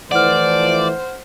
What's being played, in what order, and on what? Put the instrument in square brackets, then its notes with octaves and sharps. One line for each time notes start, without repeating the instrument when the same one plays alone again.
[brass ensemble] E3 F3 A3 [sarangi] C5 [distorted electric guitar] D5 [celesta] F#5 F6